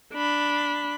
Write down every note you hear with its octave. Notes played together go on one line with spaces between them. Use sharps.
D4 B5